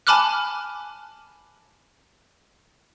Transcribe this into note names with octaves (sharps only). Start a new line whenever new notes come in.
G#5 A5 B5 D6 F6 F#6